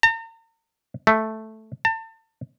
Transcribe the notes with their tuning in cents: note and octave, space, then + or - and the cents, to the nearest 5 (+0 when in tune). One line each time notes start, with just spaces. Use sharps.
A#5 -45
A3 +0
A5 +35